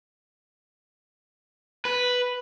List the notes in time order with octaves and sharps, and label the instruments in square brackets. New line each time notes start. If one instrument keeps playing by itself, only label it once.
[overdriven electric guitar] B4